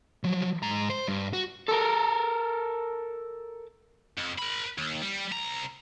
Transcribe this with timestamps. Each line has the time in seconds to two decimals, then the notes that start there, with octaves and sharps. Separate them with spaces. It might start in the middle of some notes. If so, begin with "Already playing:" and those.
0.24 F3 F#3
0.63 G#2 A#5
0.90 C5
1.08 G2
1.33 F#4
1.68 A4 A#4
4.18 F2
4.38 A#4 B5
4.78 D#2
5.02 G3
5.32 C2 A#5